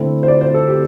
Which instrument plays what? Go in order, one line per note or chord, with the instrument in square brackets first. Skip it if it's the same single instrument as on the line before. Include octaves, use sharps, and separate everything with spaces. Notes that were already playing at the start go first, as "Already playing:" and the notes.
Already playing: [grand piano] D3 A3 C4 E4 A4
[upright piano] C5
D5
C5
A4
G4